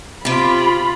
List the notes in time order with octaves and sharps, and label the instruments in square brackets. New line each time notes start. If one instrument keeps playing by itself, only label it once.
[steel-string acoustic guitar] C3 G4 [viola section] F4 B5